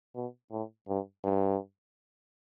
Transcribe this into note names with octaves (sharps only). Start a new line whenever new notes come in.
B2
A2
G2
G2